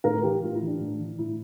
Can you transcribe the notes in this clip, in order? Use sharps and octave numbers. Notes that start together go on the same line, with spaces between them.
A2 A#4
E3 G4
A2 F4
E4
E3
D4
A2
E3
A2 E4